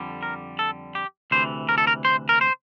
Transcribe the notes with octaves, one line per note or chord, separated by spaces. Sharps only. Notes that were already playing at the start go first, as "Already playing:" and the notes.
Already playing: F2 D3 G3
A#4
A4
G4
D2 C3 E3 C5
A#4
A4
A#4
C5
A#4
C5